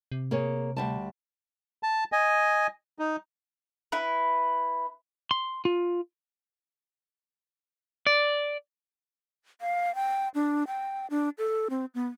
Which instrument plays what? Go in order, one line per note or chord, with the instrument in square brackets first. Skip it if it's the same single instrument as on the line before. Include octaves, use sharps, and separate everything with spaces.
[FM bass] C3
[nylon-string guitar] A#3 G#4 C#5
D2 G3 A5
[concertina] A5
D#5 G#5
D#4
[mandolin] E4 B4
[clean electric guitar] C6
F4
D5
[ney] F5
G5
D4
G5
D4
A4
C4
B3